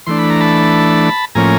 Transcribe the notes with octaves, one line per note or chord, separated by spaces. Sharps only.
E3 A3 D4 C6
B5
A#5
A5 B5
A2 F3 A#3 C#4 G#5 A#5